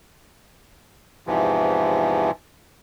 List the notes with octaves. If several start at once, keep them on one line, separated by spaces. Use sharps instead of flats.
E2 G#2 C3 E3 F3